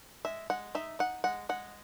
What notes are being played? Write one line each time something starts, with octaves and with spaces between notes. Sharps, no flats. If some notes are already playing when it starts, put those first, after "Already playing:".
G#3 E5
G#3 F#5
D#4 E5
D#4 F#5
G#3 F#5
G#3 F#5